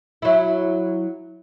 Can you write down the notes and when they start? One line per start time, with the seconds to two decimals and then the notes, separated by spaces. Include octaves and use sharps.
0.22 F#3 E4